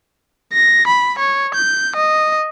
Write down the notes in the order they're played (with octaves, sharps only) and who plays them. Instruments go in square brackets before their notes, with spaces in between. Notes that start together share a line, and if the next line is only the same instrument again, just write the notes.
[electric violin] A#6
B5
C#5
G6
D#5